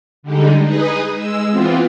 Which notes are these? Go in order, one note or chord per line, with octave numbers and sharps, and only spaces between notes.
D3 G3 G#3 D#4
D#4 G#4 B4 D#5
G#3 E6
E3 B3 C4 F4